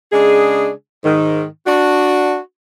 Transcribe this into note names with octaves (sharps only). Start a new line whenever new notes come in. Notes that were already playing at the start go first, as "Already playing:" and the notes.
C#3 G#3 D4 G#4
G#2 D#3
D4 F#4